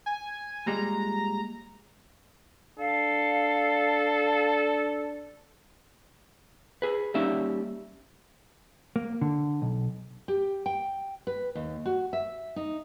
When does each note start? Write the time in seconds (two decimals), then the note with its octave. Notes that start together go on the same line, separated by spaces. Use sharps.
0.06 G#5
0.67 A#2 G3 G#3 A#5
2.79 D4 A4 F5
6.82 G#4 B4
7.14 G3 A#3 C#4 D#4 E5
8.96 A#3
9.21 D3
9.62 B1
10.28 G4
10.66 G5
11.27 B4
11.55 D#2
11.86 F#4
12.13 E5
12.56 D#4